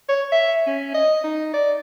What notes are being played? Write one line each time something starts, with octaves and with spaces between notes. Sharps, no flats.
C#5
E5
C#4
D#5
D#4
D5